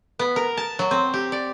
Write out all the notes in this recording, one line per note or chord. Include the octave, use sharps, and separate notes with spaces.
B3
A#4
A5
F#3
C4
G4
D5